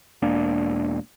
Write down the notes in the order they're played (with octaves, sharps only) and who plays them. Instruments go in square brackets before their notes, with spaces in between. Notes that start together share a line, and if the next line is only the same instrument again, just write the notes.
[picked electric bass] E1 A#3 D4